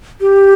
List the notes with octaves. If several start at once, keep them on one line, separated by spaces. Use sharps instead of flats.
G4